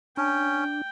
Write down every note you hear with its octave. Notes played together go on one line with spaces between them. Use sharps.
C#4 D4 G5